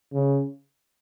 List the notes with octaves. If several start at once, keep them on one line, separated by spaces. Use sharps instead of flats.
C#3